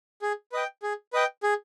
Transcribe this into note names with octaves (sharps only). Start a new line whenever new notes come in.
G#4
B4 D#5 G5
G#4
B4 D#5 G5
G#4